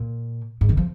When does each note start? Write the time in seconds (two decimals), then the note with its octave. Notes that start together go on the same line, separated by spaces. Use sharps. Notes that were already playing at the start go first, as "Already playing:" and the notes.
Already playing: A#2
0.61 G#2
0.69 D#3
0.77 F3